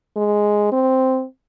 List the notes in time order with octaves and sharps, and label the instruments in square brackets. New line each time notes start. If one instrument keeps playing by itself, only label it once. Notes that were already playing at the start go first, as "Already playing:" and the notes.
[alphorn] G#3
C4